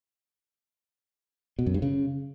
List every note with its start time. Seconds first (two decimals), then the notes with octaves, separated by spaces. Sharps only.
1.59 B2
1.66 F#2
1.74 G2
1.82 C#3